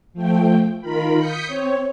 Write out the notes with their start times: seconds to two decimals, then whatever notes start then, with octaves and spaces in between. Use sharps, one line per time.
0.13 F3 A3 G5
0.81 D#3 F4 A#4 B5
1.18 D#6 G6 B6 C#7
1.47 C4 C#5